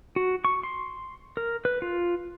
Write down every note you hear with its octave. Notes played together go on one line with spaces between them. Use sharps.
F#4
C#6
C6
A#4
B4
F4